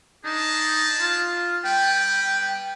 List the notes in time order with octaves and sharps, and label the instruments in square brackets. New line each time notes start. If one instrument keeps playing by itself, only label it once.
[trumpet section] D4 G#4 A5 [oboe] D#4
[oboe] F4
[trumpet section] G3 B3 B4 [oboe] G5